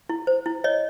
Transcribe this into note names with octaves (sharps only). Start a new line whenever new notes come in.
E4
C5
E4
C#5 D#5